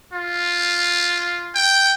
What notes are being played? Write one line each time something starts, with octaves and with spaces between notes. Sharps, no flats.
F4
G5